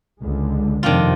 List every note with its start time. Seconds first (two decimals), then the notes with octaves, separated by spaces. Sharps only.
0.23 C#2 D3 G#3
0.83 F2 C3 D#3 D4 F4